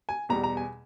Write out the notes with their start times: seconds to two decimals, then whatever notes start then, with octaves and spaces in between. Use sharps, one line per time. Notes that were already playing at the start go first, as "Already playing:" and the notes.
0.09 G#5
0.29 E2 B2 G3 A#5
0.43 A#5
0.57 G#5